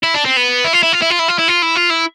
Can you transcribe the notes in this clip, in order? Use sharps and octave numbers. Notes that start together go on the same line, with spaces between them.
E4
D4
C4
B3
E4
F4
E4
F4
E4
F4
E4
F4
E4
F4
E4
F4
E4